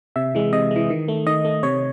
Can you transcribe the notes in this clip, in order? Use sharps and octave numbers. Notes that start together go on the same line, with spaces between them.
C3 E5
E3 G#3
C3 D#5
E3 G#3
D#3
A3
D#3 D#5
A3
C3 C#5